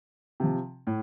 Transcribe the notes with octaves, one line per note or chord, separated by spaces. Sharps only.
C3 F3
A2